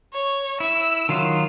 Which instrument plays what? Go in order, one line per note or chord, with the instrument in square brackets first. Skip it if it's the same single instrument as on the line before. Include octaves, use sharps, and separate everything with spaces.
[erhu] C#5
[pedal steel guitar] E4 [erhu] E6
[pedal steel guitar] D#3 F#3 F4